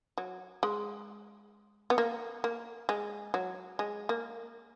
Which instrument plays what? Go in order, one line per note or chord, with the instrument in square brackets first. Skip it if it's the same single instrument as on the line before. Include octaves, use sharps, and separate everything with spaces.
[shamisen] F#3
G#3
B3
A#3
A#3
G#3
F#3
G#3
A#3